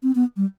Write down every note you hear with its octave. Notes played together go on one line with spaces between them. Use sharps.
C4
B3
G3